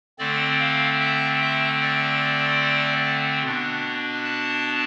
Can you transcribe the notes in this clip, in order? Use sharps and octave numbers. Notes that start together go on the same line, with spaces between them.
D3 A3 C4 D5
F5
E5
E5
D5
B2 B3 D4
A5